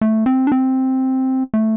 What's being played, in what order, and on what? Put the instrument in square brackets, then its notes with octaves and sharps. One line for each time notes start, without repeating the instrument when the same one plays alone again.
[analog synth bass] A3
C4
D4
C4
A3